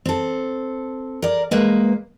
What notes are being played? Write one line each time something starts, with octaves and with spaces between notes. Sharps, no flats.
C4 A4
A#4 D5
G#3 A#3 B4